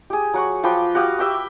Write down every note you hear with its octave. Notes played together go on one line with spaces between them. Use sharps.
G4 G#4
F#3 F#5 C#6
F3 B4 G5 D6
F#4 G4 F5 D#6
G4 E5 G5 D6